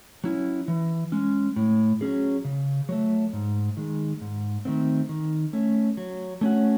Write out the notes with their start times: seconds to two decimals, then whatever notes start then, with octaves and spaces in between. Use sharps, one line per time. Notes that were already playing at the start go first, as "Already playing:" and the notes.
0.24 F#3 C#4 E4
0.68 E3
1.12 G#3 C#4
1.56 A2
2.01 F#3 C#4 G#4
2.45 C#3
2.89 F#3 A3
3.33 G#2
3.77 D#3 G#3
4.21 G#2
4.65 D#3 A3 C4
5.09 D#3
5.53 A3 C#4
5.97 F#3
6.41 A3 C#4 F#4